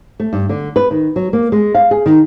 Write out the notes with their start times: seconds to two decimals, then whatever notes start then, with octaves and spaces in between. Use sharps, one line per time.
0.20 A3
0.33 G2
0.49 D3
0.76 B4
0.91 D#3
1.16 F#3
1.33 A#3
1.52 G#3
1.74 F5
1.91 G#4
2.06 D#3